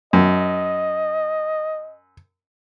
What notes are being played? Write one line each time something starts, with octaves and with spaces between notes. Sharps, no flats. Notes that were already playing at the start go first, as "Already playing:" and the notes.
F#2 D#5